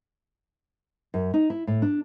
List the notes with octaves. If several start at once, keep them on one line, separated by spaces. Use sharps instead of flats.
F#2
D#4
E4
A2
D4